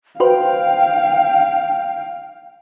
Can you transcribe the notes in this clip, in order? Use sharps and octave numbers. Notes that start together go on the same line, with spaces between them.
F#4 B4 C5 F5 G5